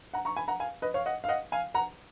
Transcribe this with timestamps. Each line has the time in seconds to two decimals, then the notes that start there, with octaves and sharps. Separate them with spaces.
0.14 F#5 A#5
0.25 A#5 C#6
0.36 G#5 B5
0.48 F#5 A#5
0.60 F5 G#5
0.82 B4 D#5
0.94 C#5 F5
1.06 D#5 F#5
1.24 F5
1.29 D#5 F#5
1.52 F5 G#5
1.74 F#5 A#5